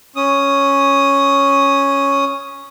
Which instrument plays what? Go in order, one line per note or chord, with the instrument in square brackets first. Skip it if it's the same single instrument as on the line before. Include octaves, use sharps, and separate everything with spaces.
[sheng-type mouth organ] C#4 D#6